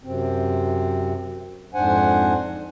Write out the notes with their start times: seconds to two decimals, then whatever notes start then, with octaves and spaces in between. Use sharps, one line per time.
0.04 F#2 C3 C4
1.74 F2 G#2 D4 C5 F#5 G#5